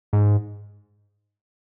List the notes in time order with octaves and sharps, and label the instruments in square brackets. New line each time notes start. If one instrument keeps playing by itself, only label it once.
[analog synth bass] G#2